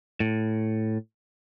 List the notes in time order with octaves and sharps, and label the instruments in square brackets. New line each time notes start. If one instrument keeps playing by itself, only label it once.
[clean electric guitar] A2